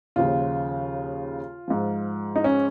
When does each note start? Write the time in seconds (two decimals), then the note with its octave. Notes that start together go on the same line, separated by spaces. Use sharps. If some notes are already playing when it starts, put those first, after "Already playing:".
0.16 D#2 C#3 F3 F4
1.68 G#2 F3
2.36 D#4
2.44 C#4